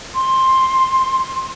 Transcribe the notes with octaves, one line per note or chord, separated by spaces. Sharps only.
C6